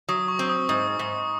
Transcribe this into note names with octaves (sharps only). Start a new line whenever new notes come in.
F#3 D#6
C#6
C4
D#6
G#2 D#6
G#2